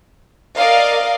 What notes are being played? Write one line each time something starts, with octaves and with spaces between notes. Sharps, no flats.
A#4 D5 D#5 F5